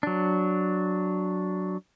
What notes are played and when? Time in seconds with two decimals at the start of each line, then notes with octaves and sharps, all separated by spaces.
0.03 F#3 D4